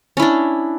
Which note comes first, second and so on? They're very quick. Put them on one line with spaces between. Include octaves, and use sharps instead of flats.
C#4 E4 D4